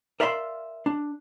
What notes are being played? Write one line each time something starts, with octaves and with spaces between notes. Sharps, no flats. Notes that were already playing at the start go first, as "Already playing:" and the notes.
A#4 D5 E5 F5 B5 C6
D4